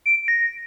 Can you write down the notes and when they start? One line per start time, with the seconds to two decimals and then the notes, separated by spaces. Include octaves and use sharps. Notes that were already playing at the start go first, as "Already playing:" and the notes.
0.06 D7
0.17 D7
0.28 A#6